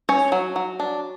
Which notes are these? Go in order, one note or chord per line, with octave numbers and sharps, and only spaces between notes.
C#4 C#5
F#3
F#3
D4